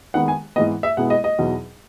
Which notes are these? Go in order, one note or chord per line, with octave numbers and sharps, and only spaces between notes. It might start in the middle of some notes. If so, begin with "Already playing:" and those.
D#3 G#3 B3 F#5
G#5
G#2 E3 B3 D#5
E5
B2 G#3 B3 E4 F#5
D#5
D#5
E2 B2 F#3 B3 D#4